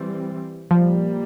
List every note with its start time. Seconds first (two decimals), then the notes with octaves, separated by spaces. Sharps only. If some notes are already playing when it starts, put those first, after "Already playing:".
Already playing: E3 G3 C4
0.71 A#2 F3 G3 A#3